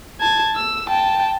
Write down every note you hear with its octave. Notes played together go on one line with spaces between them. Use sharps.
A5 G#6
E6
G5 A5